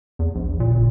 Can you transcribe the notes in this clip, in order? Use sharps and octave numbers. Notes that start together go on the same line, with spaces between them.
E2
A#1
A#2
G1